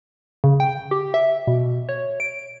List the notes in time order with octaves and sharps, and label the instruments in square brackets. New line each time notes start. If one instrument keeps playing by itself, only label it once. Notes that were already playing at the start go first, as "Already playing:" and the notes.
[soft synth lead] C#3
G5
G4
E5
B2
C#5
D7